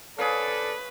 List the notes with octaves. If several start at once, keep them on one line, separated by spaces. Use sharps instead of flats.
G#4 A4 B4 C#5 D5 F5